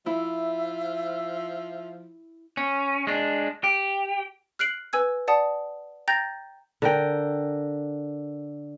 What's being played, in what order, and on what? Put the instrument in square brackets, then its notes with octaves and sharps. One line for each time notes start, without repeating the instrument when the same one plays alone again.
[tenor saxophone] F3 [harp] E4 [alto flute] E5
[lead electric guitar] C#4
G#3 D4
G4
[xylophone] F6 F#6 C7 D7 F#7
B4 G#5 E6 G#6
D5 F#5 A5 D#6
G5 A#5 G6 A6 A#6
[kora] D3 A#4 G5